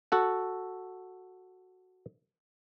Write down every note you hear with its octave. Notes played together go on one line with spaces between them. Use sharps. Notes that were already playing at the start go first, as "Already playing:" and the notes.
F#4 A4 F#5